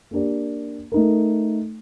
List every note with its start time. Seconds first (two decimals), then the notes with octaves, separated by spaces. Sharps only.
0.11 A#3 D4 G4 A#4 D5
0.92 A3 D#4 A#4